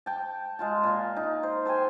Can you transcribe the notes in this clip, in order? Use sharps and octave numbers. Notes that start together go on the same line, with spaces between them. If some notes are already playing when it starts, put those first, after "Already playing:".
G5 A5
G#3 F4 A5
A#2 F4
D#4
C5
A4 C5 G5 G#5